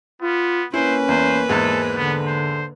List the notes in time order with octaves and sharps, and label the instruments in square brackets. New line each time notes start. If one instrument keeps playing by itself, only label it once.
[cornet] B3 [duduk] F4
[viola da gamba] A#3 B4 [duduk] C#4 [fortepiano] E4 [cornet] C5
[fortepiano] E2 [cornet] C5
[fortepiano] E2 G#2 G#3 [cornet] A4
[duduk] D3 [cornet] B3
[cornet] C5